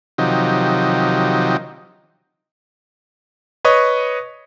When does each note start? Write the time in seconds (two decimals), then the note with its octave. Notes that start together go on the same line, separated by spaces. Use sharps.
0.18 C3 D#3 F3 F#3 D#4 G4
3.65 B4 C#5 D#5 C#6 D#6